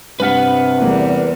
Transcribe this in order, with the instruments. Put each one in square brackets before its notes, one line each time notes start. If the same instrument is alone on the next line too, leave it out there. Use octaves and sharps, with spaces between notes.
[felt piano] G2 F6 B6 [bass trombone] C3 [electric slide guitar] B4 F#5
[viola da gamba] E2 G3 [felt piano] E3 A#3